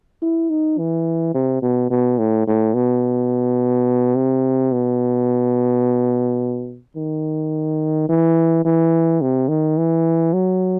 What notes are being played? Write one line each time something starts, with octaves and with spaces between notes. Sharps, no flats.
E4
D#4
E3
C3
B2
B2
A2
A2
B2
C3
B2
D#3
E3
E3
C3
D#3
E3
F#3